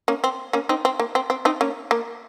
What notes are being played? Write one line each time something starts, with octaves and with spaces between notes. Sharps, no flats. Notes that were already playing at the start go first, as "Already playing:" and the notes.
A#3 C#4
C4
A#3 C#4
C4 D#4
C4
A#3
C4
C4
C4 D#4
A#3 C#4
A#3